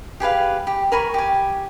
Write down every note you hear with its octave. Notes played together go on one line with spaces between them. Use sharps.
G4 G#4 B4 F5
G4
A#4 G#5 B5 C#6
G4 G#5